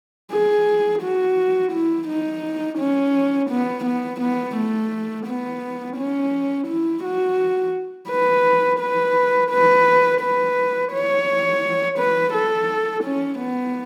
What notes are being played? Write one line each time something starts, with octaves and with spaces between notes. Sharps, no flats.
G#4
F#4
E4
D#4
C#4
B3
B3
B3
A3
B3
C#4
E4
F#4
B4
B4
B4
B4
C#5
B4
A4
C#4
B3